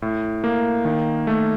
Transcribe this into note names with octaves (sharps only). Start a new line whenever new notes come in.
A2
A#3
D#3
A3